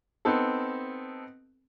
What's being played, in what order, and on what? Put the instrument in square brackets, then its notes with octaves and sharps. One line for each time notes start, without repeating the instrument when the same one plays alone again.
[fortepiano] B3 C4 D#4 A4